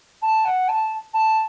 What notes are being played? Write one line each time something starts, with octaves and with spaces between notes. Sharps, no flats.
A5
F#5
A5
A5